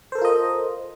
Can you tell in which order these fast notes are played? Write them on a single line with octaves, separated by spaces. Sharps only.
C5 A4 A#4 F4 D#5